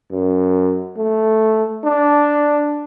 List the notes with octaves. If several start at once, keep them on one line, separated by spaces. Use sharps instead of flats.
F#2
A3
D4